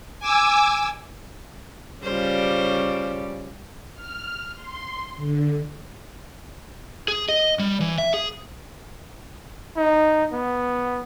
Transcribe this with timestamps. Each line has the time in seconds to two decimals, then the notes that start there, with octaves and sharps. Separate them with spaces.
0.20 G#5 D6 E6
2.03 C#3 G3 F4 C5 D5
3.94 F6
4.55 C6
5.17 D3
7.08 G#4
7.29 D#5
7.59 G3
7.80 E3
7.98 E5
8.14 G#4
9.77 D#4
10.33 B3